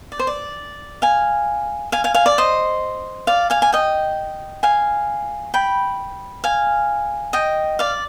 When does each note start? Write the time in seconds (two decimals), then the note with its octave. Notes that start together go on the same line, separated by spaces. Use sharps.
0.12 D5
0.19 C5
0.27 D5
1.02 F5 G#5
1.92 F5 G#5
2.04 F5 G#5
2.14 F5 G#5
2.26 D5
2.38 C5 D#5
3.27 D5 F5
3.50 F5 G#5
3.62 G#5
3.73 D#5 G5
4.63 F5 G#5
5.54 G5 B5
6.44 F5 G#5
7.33 D#5 G5
7.79 D5 F5